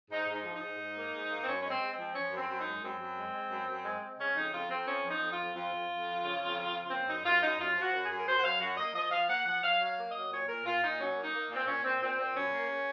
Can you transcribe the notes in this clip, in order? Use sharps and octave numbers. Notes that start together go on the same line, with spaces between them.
G#2 D#4
G#2
D#4
F3
D#4
G#2
G#2
A#3
G#2
A#3
C4
F#2 C#4
G#3 C#4
C4
G#3
C4
F3
F3 C#4
F#2 C4
F#2
D#4
G#3
F#2 C4
F#2
G#3
G#3
F#2
F#2
G#3
G#3
C#3 C#4
F2 D#4
F2 F4
F2 C4
F3 C#4
F3
D#4
F2
F4
F2
F2 F4
F2
F2
F3
C#3
F2
F3
C#3
A#3 C4
F#2 D#4
F#2 F4
F#2 D#4
F#2 F4
F3
F#4
F#2
G#4
F#2
A#4
F#2 C5
F#5
F#2 F5
F#2 F#4
A#3 D#5
F3 D#5
F3 F5
A#3 F#5
F3 F#5
F#3 F5
F#3 F5
A#3
D#5
F#3
A#2 C#5
A#2 A#4
A#2 F4
A#2 D#4
F#3 C#4
A#3
D#4
A#3
A#2 C4
A#2 C#4
A#2 C4
A#2 C4
A#2 C4
F#2 C#4
A#3
C#3